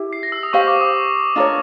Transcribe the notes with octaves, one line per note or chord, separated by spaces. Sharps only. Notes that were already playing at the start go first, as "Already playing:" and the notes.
Already playing: E4 G4
C7
A#6
E6
D#6
G4 C5 F5 C#6
D6
D#6
D4 F4 A#4 C#5